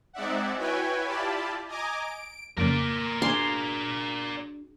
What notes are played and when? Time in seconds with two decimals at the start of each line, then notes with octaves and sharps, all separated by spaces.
0.13 G#3 C4 D#4 D5 E5 F#5
0.57 E4 F#4 B4 C#5 G5 G#5
1.06 E4 F4 G4 D5 A5 B5
1.68 D#5 G#5 A#5 D6
2.02 D7
2.58 F2 C#3 A#3 A#4 D5
3.22 D4 F#4 G#4 C6